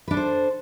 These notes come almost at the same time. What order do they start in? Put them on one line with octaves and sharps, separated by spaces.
B4 D4 A4 C5